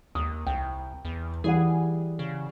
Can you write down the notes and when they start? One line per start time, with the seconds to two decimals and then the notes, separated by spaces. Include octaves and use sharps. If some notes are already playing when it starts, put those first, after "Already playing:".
0.15 D#2 D#6
0.47 C2 G5
1.05 E2
1.44 E3 G3 G#4 F#5
2.19 C#3